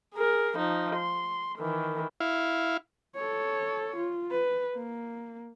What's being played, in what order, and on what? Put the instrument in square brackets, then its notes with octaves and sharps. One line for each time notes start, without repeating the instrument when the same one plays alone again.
[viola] G#4 A#4
F3 D#4
C6
D#3 E3
[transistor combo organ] E4 F5
[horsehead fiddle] A4 C#5
F4
B4
A#3